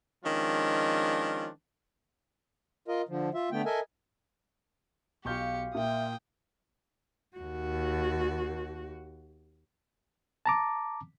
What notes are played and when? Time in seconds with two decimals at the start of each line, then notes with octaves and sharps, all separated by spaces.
0.25 D#3 F3 G#3 C#4 D4 F4
2.88 F4 A#4 D#5
3.09 D3 F3
3.34 F4 E5
3.52 D3 A3 B3 G5
3.66 A4 A#4 D#5 E5 G#5
5.25 B1 F4 G4 F5 G#5 C#6 G6 C#7
5.75 A#2 E5 G5 D#6
7.37 D#2 F#4
10.46 A5 A#5 D6